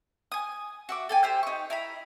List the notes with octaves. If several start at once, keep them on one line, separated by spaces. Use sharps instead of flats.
G#5 D#6
F#4 E5 D6
A4 G5 G#5
G4 C5 E5
D#4 C#6
E4 A#5 B5